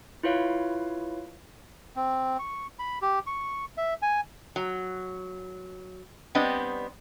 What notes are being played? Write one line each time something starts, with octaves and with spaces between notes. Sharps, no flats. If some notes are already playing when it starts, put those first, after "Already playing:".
E4 F4 B4 C#5 F5
C4
C#6
B5
G4
C#6
E5
G#5
F#3
G3 B3 C4 D4 D#5